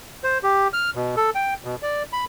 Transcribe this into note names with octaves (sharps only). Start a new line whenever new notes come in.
C5
G4
F6
B2
A4
G5
B2
D5
B5